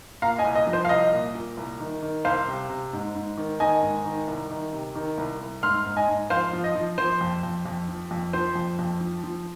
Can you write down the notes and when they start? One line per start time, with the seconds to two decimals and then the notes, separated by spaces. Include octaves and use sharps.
0.22 A#2 F5 A#5
0.38 D#5 G#5
0.45 C2
0.56 D#5
0.67 F3
0.73 C5
0.85 F5
0.89 C2 D#5
1.13 A#2
1.35 A#2
1.57 C2
1.80 D#3
2.02 D#3
2.25 C2 C5 F5
2.47 C3
2.69 C3
2.93 G#2
3.15 G#2
3.38 D#3
3.60 D#3 D#5 G#5
3.83 G#2
4.05 D#3
4.28 C2
4.51 D#3
4.73 C3
4.95 D#3
5.18 C2
5.41 C2
5.63 G#2 C6 F6
5.86 G#2
5.97 D#5 G#5
6.08 G#2
6.30 F3 C5 F5
6.53 F3
6.64 D#5
6.75 F3
6.98 F3 C5
7.21 F2
7.43 F2
7.65 F2
7.89 F3
8.11 F2
8.33 F3 C5
8.55 F2
8.79 F2
9.01 F3
9.24 F3